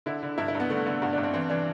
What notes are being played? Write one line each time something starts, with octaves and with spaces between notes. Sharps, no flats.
D3 E4
D3
G2 E4
E4
G2
B3
D3 A3
D3 B3
G2 F#4
D4
G2
C4
E3 C4
E3 D4